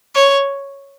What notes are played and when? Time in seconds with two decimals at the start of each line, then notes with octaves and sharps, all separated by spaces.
0.15 C#5